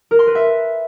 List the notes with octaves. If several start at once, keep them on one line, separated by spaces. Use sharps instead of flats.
A#4
C6
B4
E5